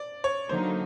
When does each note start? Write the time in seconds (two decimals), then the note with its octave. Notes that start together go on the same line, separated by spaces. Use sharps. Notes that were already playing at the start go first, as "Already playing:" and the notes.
Already playing: D5
0.24 C#5
0.49 D3 F#3 A#3 D#4 C5